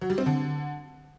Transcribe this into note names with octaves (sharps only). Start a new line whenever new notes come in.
F#3
G3
C4
D3